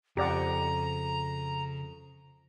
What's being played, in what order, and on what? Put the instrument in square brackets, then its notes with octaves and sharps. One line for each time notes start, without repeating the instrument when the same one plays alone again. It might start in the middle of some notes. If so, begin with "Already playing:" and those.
[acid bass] F2 [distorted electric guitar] C#3 [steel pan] G4 D5 F#5 [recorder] A#5